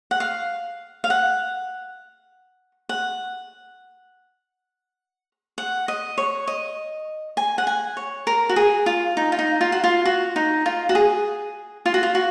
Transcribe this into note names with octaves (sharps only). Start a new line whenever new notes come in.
F#5
F5
F5
F#5
F#5
F#5
D#5
C#5
D#5
G#5
F#5
G#5
C#5
A#4
F#4
G#4
F4
D#4
F4
D#4
F4
F#4
F4
F#4
D#4
F4
F#4
G#4
F4
F#4
F4
F#4